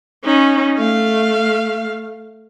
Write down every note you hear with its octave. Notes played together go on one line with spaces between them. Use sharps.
C#4 D#4
A3 F5